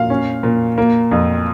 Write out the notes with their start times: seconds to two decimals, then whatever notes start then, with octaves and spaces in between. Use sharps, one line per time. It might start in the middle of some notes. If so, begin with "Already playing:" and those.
Already playing: A#2 F5
0.10 C#4
0.43 A#2
0.78 A#3
1.11 F2